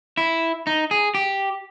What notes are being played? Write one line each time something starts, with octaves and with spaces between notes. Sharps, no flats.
E4
D#4
G#4
G4